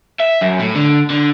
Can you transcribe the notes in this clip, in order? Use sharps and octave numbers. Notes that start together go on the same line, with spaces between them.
E5
F#2
A2
D3
D3